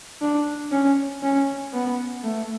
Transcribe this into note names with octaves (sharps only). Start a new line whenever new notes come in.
D4
C#4
C#4
B3
A3